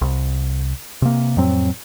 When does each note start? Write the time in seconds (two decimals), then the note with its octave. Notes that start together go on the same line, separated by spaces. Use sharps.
0.01 C2
1.02 C3 A#3
1.37 F2 A2 F#3 C4